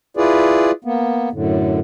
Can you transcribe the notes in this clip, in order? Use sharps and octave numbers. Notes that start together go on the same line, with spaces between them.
E4 F4 G#4 B4 D5
A#3 B3
F#2 A2 D3